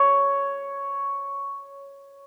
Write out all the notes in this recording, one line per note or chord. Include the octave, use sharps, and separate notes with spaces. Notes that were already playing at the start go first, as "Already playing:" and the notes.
Already playing: C#5